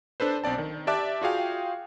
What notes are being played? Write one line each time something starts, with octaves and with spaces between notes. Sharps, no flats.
D4 A4 B4 C5
B1 C4 D5 A5
D#3
G4 D5 E5 A5 D6 F#6
F4 F#4 G#4 F5 G5